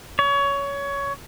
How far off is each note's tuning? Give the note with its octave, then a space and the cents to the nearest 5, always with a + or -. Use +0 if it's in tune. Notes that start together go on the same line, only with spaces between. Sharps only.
C#5 +20